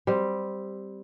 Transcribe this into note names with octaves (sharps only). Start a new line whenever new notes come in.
G3 C4